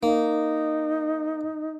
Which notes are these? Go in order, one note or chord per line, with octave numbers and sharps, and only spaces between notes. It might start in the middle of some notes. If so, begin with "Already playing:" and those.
A#3 D#4